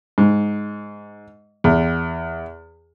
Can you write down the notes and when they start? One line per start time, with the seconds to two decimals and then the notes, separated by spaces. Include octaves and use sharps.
0.18 G#2
1.64 E2